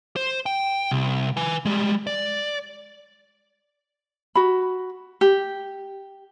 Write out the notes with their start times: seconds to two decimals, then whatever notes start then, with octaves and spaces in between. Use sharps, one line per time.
0.16 C5
0.46 G5
0.91 C2
1.37 B4 G#5
1.65 G3 G#3
2.07 D5
4.35 F#4 B5
5.21 G4